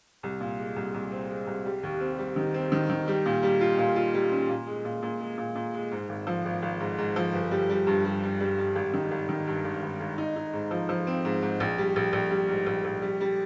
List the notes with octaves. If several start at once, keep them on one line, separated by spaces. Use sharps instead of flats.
C2
A#2
G#3
C2
C2
C4
G#3
C2
G3
D#2
C4
G3
D#3
C4
D#3
D#3
G3
A#2
G3
F4
A#2
F4
G3
C#4
A#2
G#3
A#2
A#2
G#3
A#2
A#2
G#3
G#2
G#1
F3
G#1
G#1
G#2
G#2
F3
G1
G3
G3
G2
G3
G3
G3
G3
G#1
D#3
G#1
D#3
G2
G#1
G#1
G#1
D#4
D#4
G#2
F3
F3
C4
G#2
G#2
A#1
G3
A#1
A#1
G3
G#2
A#1
A#1
G3
G3